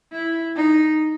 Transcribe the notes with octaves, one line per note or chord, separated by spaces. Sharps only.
E4
D#4